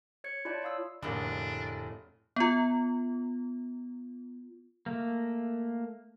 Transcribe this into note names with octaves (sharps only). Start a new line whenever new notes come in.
C#5 G#6 C#7
E4 F4 C#5 D5 A5
C#5 D5 F5 D#6 E6
F1 A2 D3 G#3 A#3 D4
B3 F4
A3 A#3